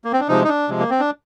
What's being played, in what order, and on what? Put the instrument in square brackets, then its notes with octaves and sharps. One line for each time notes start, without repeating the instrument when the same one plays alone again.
[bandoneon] A#3
C4
D4
C3 F3 G#3 D#4
D#4
D4
C3 F3 G#3
A#3
C4
D4